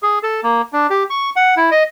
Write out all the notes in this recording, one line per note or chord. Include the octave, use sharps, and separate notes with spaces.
G#4
A4
A#3
D4
G4
C#6
F#5
E4
D#5